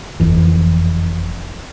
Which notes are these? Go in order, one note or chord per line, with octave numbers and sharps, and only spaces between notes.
F#1 F2 E3